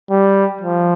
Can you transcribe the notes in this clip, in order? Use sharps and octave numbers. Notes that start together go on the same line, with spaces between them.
G3
F3